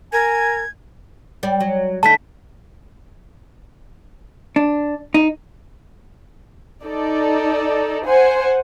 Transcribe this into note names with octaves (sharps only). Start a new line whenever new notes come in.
A#4 G#5 G#6
G3 D5
F#3
D3 A3 D#4 A5 B6
D4
D#4
D#4 A4 D5
C5 F#5 G#5